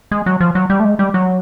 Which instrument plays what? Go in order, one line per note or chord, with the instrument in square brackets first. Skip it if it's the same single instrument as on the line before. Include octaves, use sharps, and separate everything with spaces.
[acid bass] G#3
F#3
F3
F#3
G3
A3
G#3
G3
F#3